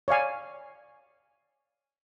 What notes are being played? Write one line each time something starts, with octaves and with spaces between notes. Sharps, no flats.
C#5 D5 F5 G#5